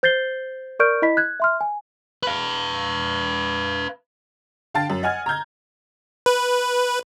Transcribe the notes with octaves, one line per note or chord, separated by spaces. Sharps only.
C5 G6 A6 C7 G7
A#4 D5 C#6 F6 G6 D7
E4 D#5 B5 B6
F#6 G#6
E5 C6 F6
G#5
B4 F5
D3 F5 G5 A5 A6
F#2
D#5 F#5 G#5 F6 G#6
A#5 F6 G6 G#6
B4